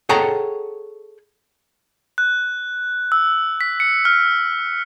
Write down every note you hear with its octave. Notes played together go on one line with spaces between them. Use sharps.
G#4 A4 C#5 F#5 G5 A#5
F#6
E6
B6
C#7
F6